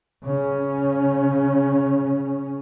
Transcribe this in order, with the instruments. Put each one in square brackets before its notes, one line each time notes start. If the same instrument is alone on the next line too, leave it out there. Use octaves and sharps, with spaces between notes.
[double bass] C#3 C#4